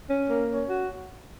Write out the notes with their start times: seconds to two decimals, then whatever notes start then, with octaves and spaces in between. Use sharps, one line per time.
0.10 C#4
0.29 A#3
0.49 C#4
0.69 F#4